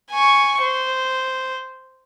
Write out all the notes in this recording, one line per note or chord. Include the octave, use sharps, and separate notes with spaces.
G#5 C#6
C5